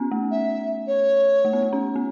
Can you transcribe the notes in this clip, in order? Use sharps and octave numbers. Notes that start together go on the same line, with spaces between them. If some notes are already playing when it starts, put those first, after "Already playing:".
Already playing: B3 C#4
A3
E5
C#5
A3
B3
A3
C#4
B3